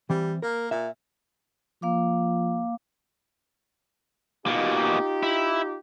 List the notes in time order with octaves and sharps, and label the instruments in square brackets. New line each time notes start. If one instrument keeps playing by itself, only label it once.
[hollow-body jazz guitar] E3 C4 [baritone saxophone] G3
[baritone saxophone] A#3 [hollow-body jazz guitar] A#4
[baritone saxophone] A#2 [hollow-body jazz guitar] E5
[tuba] F3 [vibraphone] A#3 F5 D6
[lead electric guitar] B2 A#3 [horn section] D#4 F4 G4
[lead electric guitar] E4